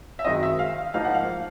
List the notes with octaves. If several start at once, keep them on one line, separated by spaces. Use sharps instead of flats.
E5
F#2 D#3 G#3 C4 D#5
E5
F5
G#2 F3 A#3 D#4 F5
F#5
F5